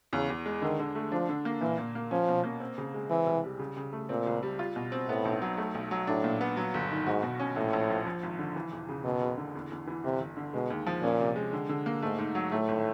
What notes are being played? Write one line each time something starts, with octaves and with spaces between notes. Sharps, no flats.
E2 C#3
E2
G#3
D3 D#3
D3
A3
F3 D4
D3
A#3
A#2 E3
A#2
A#3
F3 C#4
B2
A#3
C4
C#3
G#3
E3 C4
C2
G3
C#3
C#3
A3
A#2 C4
C#2
G3
F4
B2
C4
A2 B3
B1
F#3
A3
B1
F#3
A2 D4
A#2
B3
F#3
G1
D#3
G#2 F#4
B2
C#4
A#1 A2
A#1
F3
F3
G#1
D3
E3
E1
C#3
F#1 B2
F#1
D3
E2
E2
E3
G1 C3
G1
D3
B2 G#3
D#2
F3
A#2 C#4
C3
G#3
D3
D3
A#3
G#2 A3
G#2
F#3
A2 A3
G#1